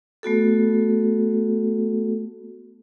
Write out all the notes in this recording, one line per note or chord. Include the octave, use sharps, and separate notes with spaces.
A3 B3 F#4 A4